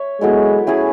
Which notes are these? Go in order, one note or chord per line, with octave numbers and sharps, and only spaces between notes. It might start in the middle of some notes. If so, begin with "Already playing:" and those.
Already playing: C#5 E5
F#3 G#3 B3 E4 A4
A3 C#4 E4 G#4